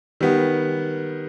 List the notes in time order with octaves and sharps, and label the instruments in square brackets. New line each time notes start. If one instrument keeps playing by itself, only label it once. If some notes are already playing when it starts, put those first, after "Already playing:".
[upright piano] D#3 G3 B3